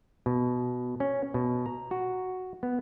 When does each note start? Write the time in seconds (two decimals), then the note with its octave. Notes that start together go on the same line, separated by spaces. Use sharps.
0.26 B2
1.00 C#4
1.34 B2
1.66 A#5
1.91 F#4
2.63 B3